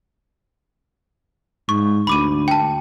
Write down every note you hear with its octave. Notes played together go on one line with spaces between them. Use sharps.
G#2 C#6
D2 B5 D6 D#7
G5 A5